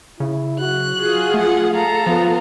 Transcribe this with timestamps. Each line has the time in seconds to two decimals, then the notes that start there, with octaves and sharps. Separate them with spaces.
0.20 C#3 E4
0.60 F#3 F#4 F#6
0.99 F4 G#4
1.34 F3 A3 F#5
1.73 A4 F5 A#5
2.07 F3 B3 F4